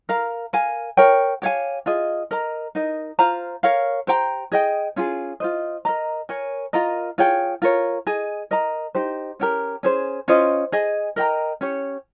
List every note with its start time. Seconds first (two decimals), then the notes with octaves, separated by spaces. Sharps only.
0.09 A#4 F5 A#5
0.53 A#4 F5 G#5
0.97 A#4 C#5 G5
1.42 G4 C#5 F5 G#5
1.86 F4 G#4 D#5
2.31 A#4 D#5 A#5
2.75 D#4 A#4 D#5
3.19 F4 C5 F5 A#5
3.63 A#4 C#5 F5
4.07 G4 C5 G5 A#5
4.52 G#4 D#5 G5
4.96 C#4 F4 G#4
5.40 F4 C5 D#5
5.85 A#4 D#5 A#5
6.29 A#4 C#5 G#5
6.73 F4 A#4 D#5 A#5
7.18 F4 G#4 C#5 G5
7.62 F4 A#4 C#5
8.07 G#4 D#5 G#5
8.51 A#4 D#5 A#5
8.95 D#4 G4 C5
9.40 C#4 G4 A#4
9.83 C#4 G#4 C5
10.28 C#4 F4 C5 D#5
10.72 G#4 D#5 G#5
11.16 A#4 D#5 G5 A#5
11.61 C#4 G4 C#5